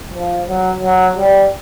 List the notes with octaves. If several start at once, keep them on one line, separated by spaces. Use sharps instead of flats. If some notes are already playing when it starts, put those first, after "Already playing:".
F3
F#3
F#3
G3